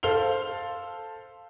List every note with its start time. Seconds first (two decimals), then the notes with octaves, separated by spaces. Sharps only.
0.03 A4 C5 F5 F7 G7